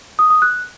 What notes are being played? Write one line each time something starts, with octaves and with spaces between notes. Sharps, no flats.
D#6
D#6
F#6